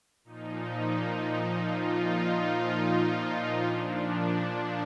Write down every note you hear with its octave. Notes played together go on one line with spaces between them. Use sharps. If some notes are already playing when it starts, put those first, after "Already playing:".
A#2 F3 D#4
F4
D#4
A#2 F3 D4